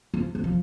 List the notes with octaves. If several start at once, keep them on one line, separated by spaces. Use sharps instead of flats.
F3
F#3
F3